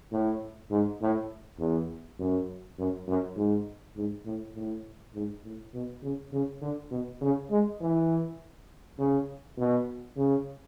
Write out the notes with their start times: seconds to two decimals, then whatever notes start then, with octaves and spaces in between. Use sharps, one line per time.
0.12 A2
0.71 G#2
1.01 A2
1.59 E2
2.19 F#2
2.78 F#2
3.07 F#2
3.36 G#2
3.96 G#2
4.25 A2
4.55 A2
5.14 G#2
5.44 A2
5.74 B2
6.02 C#3
6.33 C#3
6.61 D3
6.91 B2
7.21 C#3
7.50 G#3
7.81 E3
8.98 C#3
9.57 B2
10.16 C#3